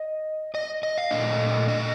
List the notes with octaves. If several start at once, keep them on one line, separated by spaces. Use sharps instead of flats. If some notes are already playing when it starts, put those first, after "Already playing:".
Already playing: D#5
D#5
D#5
F5
A#2 A3 D4 D#5
D#5